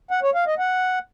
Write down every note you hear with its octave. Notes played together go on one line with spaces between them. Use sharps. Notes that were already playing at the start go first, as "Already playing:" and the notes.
F#5
C#5
F5
D#5
F#5